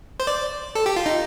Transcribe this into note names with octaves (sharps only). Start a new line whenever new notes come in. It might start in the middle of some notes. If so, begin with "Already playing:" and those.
C5
D5
A4
G4
F4
D#4